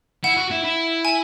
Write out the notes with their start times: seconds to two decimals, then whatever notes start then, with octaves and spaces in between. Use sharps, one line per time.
0.24 E4 F#5
0.37 F#4
0.51 E4
0.64 E4
1.05 G#5